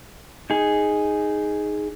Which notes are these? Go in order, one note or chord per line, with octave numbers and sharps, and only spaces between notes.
D#4 G#4